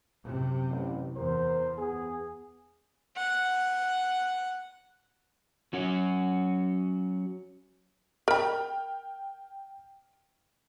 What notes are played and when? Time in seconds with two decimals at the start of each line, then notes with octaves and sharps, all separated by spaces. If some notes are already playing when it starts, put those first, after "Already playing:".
0.25 F#2 C3
0.70 A1
1.17 E2 A#4 C5
1.77 B3 G#4
3.16 F#5
5.73 F#3 C#4 F#4
8.28 A#4 G5 B5 F6